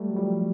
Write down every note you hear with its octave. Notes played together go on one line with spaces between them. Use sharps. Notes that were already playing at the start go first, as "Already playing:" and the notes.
Already playing: G3 A3
F#3
F3 G3